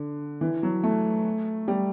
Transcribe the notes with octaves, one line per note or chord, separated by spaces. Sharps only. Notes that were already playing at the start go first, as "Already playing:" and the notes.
Already playing: D3
E3
F#3
A3
G3